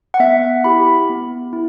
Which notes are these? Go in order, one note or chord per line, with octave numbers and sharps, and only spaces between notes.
F#5
B3 E5
E4 G4 B5
B3
E4